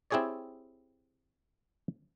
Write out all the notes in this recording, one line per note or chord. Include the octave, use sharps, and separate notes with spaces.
C4 E4 G4 G#4 C#5 D5